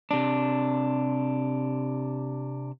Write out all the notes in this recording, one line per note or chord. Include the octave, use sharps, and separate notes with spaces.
C3 D4